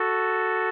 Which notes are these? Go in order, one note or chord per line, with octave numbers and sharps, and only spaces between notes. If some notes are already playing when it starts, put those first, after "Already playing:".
Already playing: F#4 A4